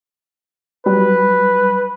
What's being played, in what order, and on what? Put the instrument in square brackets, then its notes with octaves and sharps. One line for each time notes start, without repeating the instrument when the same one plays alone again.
[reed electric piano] F#3 G3 [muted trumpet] B4